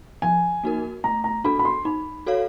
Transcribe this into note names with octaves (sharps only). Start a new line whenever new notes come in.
F3 G#5
A#3 D#4 F#4 A#4
A3 A#5
A#5
D4 F#4 A4 B5
B5
C6
D#4 B5
F#4 A4 C#5 F5